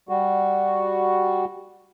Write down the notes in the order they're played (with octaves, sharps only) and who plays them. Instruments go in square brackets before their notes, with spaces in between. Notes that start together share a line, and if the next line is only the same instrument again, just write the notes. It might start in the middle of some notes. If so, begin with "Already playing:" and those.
[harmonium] G3 F#4